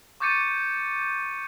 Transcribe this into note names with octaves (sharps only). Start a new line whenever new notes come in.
C#6 D6 G6 A6 C#7 D#7